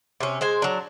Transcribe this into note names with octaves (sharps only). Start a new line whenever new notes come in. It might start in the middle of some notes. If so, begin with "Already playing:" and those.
C3 C#4
G#3 C5 G#5
F#3 D4